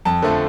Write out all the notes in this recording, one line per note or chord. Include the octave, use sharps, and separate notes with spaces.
F2 A5
D3 F3 A3